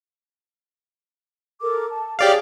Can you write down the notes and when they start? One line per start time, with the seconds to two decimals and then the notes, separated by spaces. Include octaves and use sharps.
1.61 A4 A#4 D6
1.90 A5
2.19 G4 G#4 C#5 D5 F5